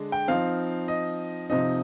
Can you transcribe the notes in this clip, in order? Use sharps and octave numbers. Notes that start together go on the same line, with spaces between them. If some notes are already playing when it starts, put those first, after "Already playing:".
Already playing: D3 G#3 D4
G5
F3 C4 D#4 F5
D#5
C3 F3 C4 D#4 D#5